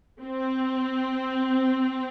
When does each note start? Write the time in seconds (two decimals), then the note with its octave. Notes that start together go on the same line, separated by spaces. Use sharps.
0.23 C4